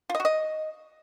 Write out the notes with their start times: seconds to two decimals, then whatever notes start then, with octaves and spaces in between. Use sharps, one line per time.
0.10 F4
0.15 D#5
0.20 F#4
0.25 D#5